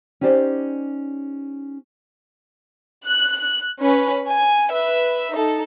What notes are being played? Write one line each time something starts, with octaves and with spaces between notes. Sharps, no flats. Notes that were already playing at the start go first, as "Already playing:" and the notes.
C#4 D#4 G4 C5 D5
F#6
C#4 B4
G#5
B4 E5
D#4 A4